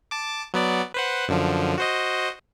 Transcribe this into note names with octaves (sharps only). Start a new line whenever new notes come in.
A5 D6
F#3 B3 D5
B4 C5 F#5
F#2 D3 F3
F#4 C5 D#5